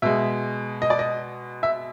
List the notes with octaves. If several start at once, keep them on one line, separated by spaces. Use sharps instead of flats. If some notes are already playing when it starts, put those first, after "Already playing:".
B2 G#3 E5
D#5
D5
D#5
E5